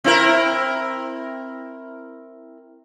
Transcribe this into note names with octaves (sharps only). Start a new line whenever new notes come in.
C4 E4 A#4